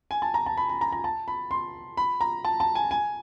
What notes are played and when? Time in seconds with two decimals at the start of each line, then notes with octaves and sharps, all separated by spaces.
0.11 G#5
0.22 A5
0.34 A#5
0.46 A5
0.57 B5
0.69 B5
0.81 A#5
0.92 A#5
1.04 A5
1.28 B5
1.51 C6
1.97 B5
2.21 A#5
2.45 A5
2.60 A5
2.75 G#5
2.91 G#5